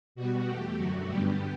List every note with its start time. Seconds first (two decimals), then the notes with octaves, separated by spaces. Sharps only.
0.15 B2 G3 B3 F#4
0.46 E2 B2 A3 G4
0.77 F#2 D3 F#3 A3 F#4
1.07 G2 D3 G3 B3 G4